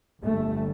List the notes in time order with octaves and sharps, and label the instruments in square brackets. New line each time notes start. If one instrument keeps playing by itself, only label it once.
[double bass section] G1 G2 A3